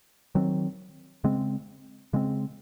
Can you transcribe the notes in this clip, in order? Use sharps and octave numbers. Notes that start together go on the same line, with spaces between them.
D#3 F#3 C4
C#3 G#3 C4
C#3 G#3 C4